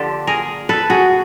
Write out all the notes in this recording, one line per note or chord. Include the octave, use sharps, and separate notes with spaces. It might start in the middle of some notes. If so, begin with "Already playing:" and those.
Already playing: D3 F3 A#3 D4 G4 A4
G#4 A#4
A4 B4
F#4 G#4